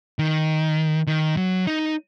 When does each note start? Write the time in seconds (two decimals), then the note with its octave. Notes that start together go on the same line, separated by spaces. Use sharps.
0.19 D#3
1.07 D#3
1.37 F#3
1.67 D#4